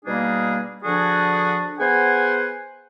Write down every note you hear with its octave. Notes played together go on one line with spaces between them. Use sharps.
B2 G3 A#3 D4 D#4 G#4
D3 F3 D4 F#4 G#4
B3 G#4 C5 F#5 G#5